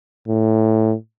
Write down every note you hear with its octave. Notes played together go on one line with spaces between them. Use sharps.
A2